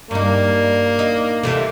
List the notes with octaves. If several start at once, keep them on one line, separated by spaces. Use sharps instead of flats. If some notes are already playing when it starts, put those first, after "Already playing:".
G2 A#3 D#4
D#4
C3 E3 A3